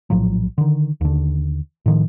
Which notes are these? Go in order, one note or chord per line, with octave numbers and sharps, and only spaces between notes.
A#1 A2 F3 F#3
D3 D#3
D#2 D3
A2 D#3 F3